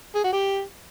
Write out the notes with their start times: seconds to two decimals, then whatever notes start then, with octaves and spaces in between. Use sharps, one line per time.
0.15 G#4
0.24 F#4
0.32 G4